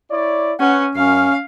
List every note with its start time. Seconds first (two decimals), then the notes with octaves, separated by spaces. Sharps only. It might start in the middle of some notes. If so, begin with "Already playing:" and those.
0.11 E4 C#5 D5
0.60 C#4 B4 C#5 F#5
0.96 F#2 C#4 F5